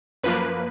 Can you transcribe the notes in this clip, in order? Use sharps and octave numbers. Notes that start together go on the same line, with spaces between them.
F#2 F3 A#3 B4